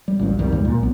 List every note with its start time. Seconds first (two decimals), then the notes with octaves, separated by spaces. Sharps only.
0.08 G3
0.19 A1 D2 G2
0.38 C2 F2 D#3 G3
0.52 D2 G#2 G#3
0.65 A#2
0.80 B1 B3